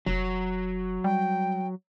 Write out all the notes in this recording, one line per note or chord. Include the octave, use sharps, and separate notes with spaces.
F1 F#3
G3 G5